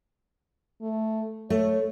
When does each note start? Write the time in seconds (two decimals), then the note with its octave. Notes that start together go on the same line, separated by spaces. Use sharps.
0.81 A3
1.50 A3 C#5